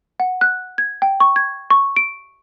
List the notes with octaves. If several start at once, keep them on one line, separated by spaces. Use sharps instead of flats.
F#5
F#6
G#6
G5
C#6
G#6
C#6
D7